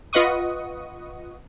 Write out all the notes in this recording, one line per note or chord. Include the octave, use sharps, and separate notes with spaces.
F4 B4 D#5 F#5 C#6 D#6